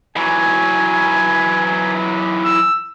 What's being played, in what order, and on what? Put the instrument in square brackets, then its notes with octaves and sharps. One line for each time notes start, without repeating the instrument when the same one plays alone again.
[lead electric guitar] E3 F#3 [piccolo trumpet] G#5
[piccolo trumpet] E6